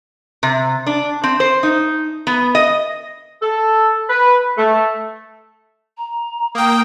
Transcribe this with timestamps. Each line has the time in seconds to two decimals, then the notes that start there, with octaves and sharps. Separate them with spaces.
0.43 C3
0.87 D4
1.24 C4
1.40 C5
1.63 D#4
2.27 B3
2.55 D#5
3.40 A4
4.08 B4
4.56 A3
5.98 A#5
6.55 A#3 G5 D#6